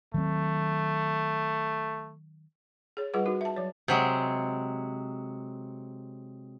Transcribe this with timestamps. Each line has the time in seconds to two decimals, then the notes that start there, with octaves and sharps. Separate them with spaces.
0.14 D#3 F#3 A3 C4
2.97 G#4 C#5
3.14 G3 F4 G#4 B4 F#5 D6
3.26 D#4 F#4 A#4
3.41 E5 A5
3.56 F#3 C#5
3.88 C3 F#3 G#3